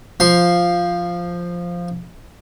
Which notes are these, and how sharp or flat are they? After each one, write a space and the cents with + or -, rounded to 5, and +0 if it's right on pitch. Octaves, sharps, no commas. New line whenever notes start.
F3 +0 C6 +0